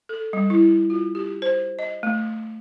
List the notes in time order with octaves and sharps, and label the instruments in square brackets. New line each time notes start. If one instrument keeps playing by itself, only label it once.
[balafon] A4
G3
E4
F4
G4
C5
D#5
A3